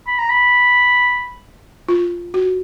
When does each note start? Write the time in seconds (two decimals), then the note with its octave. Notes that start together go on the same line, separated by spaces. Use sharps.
0.07 B5
0.19 A#5
0.29 B5
1.89 F4
2.34 F#4